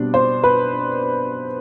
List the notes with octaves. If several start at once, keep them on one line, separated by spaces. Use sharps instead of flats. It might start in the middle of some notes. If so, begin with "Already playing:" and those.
Already playing: B2 G3 C4 D4
C5
B4